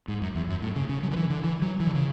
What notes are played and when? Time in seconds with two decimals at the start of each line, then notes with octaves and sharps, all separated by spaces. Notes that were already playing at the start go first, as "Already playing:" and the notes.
0.08 G#2
0.22 F#2
0.35 E2
0.49 F#2
0.62 A2
0.76 C#3
0.89 C#3
1.03 F#3
1.11 D3
1.16 E3
1.30 D3
1.44 E3
1.62 F#3
1.80 E3
1.87 D3
1.95 C#3